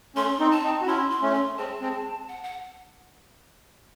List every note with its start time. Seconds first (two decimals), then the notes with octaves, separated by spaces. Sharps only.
0.16 A3 C#4 C6
0.40 C4 D#4
0.52 A5
0.63 C4 D#4
0.82 F#4
0.87 C#4 E4 C6
1.10 C6
1.22 A3 C#4
1.34 C6
1.58 G#3 C4 A5
1.81 G#3 C4
2.28 F#5
2.43 F#5